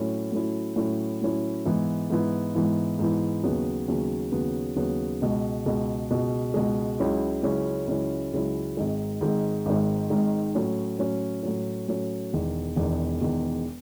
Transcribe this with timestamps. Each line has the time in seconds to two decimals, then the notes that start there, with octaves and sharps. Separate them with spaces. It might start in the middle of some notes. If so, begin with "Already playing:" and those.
Already playing: A2 F#3 C#4 E4
0.32 A2 F#3 C#4 E4
0.76 A2 F#3 C#4 E4
1.21 A2 F#3 C#4 E4
1.65 G#2 E3 B3 E4
2.10 G#2 E3 B3 E4
2.55 G#2 E3 B3 E4
2.99 G#2 E3 B3 E4
3.44 D#2 C#3 F#3 B3
3.88 D#2 C#3 F#3 B3
4.32 D#2 C#3 F#3 B3
4.76 D#2 C#3 F#3 B3
5.22 C#2 B2 G#3
5.66 C#2 B2 G#3
6.11 C#2 B2 G#3
6.54 C#2 B2 G#3
6.99 C#2 C#3 F#3 C#4 E4
7.43 C#2 C#3 F#3 C#4 E4
7.88 C#2 C#3 F#3 C#4 E4
8.33 C#2 C#3 F#3 C#4 E4
8.77 G#1 G#2 D#3 G#3
9.21 G#1 G#2 D#3 G#3
9.66 G#1 G#2 D#3 G#3
10.10 G#1 G#2 D#3 G#3
10.55 A2 F#3 C#4
10.99 A2 F#3 C#4
11.43 A2 F#3 C#4
11.88 A2 F#3 C#4
12.33 E1 E2 D#3
12.76 E1 E2 D#3
13.21 E1 E2 D#3